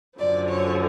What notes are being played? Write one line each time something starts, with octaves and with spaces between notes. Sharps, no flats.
F#2 D3 F3 D5
C#5